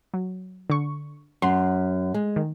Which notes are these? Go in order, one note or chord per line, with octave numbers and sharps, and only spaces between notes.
F#3
D3 C#6
F#2 C6
G#3
D#3